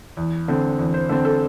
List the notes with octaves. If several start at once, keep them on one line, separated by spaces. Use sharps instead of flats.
E2
D3 C4
E2
C5
D3 C4 A4
A4